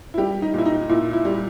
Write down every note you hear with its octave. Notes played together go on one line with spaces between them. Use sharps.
E4
G3 G4
D#4
A#2 E4
D#4
A#2 E4
E4
G3